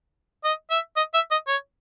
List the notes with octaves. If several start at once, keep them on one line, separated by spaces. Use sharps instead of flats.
D#5
E5
D#5
E5
D#5
C#5